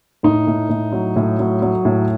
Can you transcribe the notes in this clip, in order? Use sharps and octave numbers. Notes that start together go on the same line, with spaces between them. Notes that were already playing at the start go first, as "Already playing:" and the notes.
A2 D#4
A2
A2
F#3
A2
F#3
F#3
A2